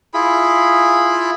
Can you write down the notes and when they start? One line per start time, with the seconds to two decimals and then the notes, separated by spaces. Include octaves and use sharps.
0.14 E4 F4 G#4 B5